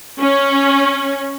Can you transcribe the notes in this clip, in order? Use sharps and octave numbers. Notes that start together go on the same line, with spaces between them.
C#4